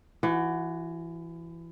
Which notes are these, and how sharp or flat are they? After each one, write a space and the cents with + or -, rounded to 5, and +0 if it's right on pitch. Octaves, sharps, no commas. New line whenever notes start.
E3 +25 F#4 +0